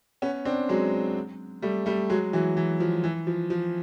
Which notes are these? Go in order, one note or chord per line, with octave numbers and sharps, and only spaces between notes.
B3 C#4
C4 D4
F#3 G#3
G3 A3
G3 A3
F#3 G#3
E3 F#3
E3
F3
E3
F3
F3